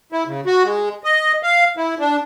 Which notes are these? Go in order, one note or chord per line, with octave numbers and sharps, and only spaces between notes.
E4
C#3
F#4
G#3
D#5
F5
E4
D4